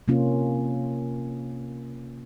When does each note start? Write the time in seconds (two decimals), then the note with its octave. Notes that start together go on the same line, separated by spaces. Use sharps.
0.08 C3 A#3 C#4 F4